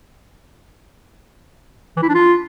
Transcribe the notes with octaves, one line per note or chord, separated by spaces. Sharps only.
E3
E4
D4
F4